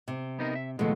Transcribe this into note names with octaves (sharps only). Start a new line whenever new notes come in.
C3
B3 D#4 A#4
E5
D#2 B2 F3 G#3 A3